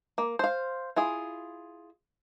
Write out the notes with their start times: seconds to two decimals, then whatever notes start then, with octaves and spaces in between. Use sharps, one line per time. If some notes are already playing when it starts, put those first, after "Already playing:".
0.18 A#3
0.39 C5 F5
0.96 E4 F4 G#4